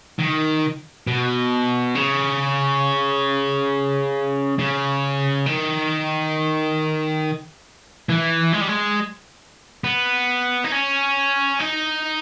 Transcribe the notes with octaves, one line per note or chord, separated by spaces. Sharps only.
D#3
B2
C#3
C#3
D#3
E3
G#3
G3
G#3
B3
D#4
C#4
D#4